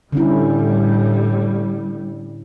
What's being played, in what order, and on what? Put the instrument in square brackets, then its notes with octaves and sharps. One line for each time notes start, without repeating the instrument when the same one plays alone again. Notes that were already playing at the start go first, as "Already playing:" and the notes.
[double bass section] A2 G3 [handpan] D3 C#4 E4